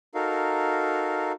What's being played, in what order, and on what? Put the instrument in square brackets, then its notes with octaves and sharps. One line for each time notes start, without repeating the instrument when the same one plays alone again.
[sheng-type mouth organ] D#4 F#4 A4 A#4 F5